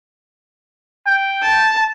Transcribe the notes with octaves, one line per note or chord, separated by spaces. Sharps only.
G5
A5